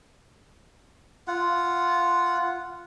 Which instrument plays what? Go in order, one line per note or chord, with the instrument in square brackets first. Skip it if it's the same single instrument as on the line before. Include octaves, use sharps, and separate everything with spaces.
[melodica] F4 F#5